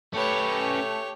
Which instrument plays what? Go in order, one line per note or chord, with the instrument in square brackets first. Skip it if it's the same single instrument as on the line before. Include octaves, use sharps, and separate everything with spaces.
[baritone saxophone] A3 [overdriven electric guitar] C#4 B4 [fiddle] G4 C#5